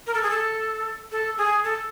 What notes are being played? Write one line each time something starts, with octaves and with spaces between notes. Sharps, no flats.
A#4
A4
G#4
A4
A4
G#4
A4